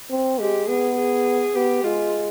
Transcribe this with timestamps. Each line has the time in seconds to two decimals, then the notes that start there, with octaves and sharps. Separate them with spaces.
0.11 C4
0.40 G#3 G4
0.68 B3 G#4
0.98 G#4
1.55 B3 G4
1.84 G#3 F4